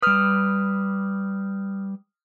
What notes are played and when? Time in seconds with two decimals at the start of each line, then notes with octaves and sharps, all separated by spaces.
0.02 G3 B4 D#6 F6